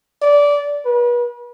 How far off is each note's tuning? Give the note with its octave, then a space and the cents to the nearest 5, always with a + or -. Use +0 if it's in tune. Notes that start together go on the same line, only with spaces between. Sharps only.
D5 -20
B4 -40